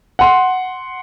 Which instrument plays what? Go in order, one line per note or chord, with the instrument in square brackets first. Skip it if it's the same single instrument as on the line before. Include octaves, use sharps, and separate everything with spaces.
[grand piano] F#5 C6